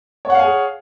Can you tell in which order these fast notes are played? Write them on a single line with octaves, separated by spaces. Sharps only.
C#5 F#5 F5 G#5 G#4